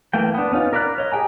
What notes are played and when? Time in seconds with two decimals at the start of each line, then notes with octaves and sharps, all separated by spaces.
0.13 E3 A3 A#3 G5
0.34 B3 D4
0.52 B3 C#4 D#4 F4
0.73 A#4 D5 F5 B5 F#6
0.98 C#5 D#5
1.12 G4 G#4 G5 G#5 A#5